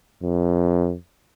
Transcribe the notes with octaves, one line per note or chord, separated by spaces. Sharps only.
F2